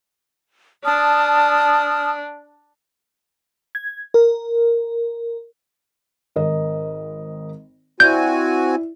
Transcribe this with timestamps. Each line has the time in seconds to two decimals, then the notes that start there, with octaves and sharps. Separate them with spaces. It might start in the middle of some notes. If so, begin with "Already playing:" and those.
0.84 D4 A5 D#6 F6
3.75 G#6
4.14 A#4
6.36 G#1 A#4 D#5
8.00 C4 E4 F#4 D5 G#5 G6